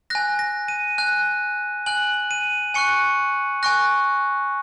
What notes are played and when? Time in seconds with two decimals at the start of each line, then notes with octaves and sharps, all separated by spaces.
0.10 G#5 F#6 A#6
0.39 A#6
0.68 D#7
0.98 G#5 F#6
1.86 G#5 F#6 F#7
2.31 D#7
2.74 G#5 C#6 F#6 C#7
3.63 G#5 C#6 F#6 A#6